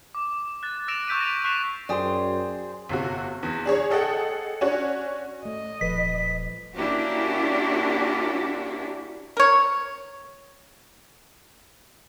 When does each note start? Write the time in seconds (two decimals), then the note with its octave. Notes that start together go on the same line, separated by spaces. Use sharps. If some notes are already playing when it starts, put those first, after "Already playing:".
0.15 D6
0.63 F#6 A6
0.88 E6 F#6 A#6 D7 E7 F7
1.07 C#6 E6 G6 B6 D7 D#7
1.21 A#6 F7
1.44 C#6 F#6 B6 C7 E7
1.89 F#2 G#4 C5 D5 G5 D#6
2.89 G1 C3 F#4
3.43 E2
3.65 D4 G#4 C#5
3.90 G#4 A4 D#5 F#5 G5
4.61 C#4 D4 F#4 C#5
5.43 A3 D5 D#5
5.81 D#1 F3 A4 B4 B6
6.75 A#3 C#4 D4 E4 F#4 G4
9.37 A#4 C#5